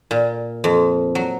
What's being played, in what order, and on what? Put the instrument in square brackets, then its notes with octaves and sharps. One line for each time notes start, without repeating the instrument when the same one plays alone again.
[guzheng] A#2
F2
F#3